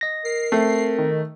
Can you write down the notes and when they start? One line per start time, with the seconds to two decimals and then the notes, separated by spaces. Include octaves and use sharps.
0.01 D#5 A#6
0.25 A#4 C7
0.52 A3 C4
0.98 D#3